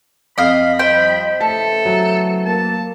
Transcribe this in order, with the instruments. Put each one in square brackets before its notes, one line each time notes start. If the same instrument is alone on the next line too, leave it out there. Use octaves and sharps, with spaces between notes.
[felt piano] F2 [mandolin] D#5 F5 [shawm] B5
[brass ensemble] F3 G3 D#5 [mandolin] C5 G5
[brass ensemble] C#3 E3 A3 [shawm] A4 [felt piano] A5
[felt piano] F#3
[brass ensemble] A#3 [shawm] A5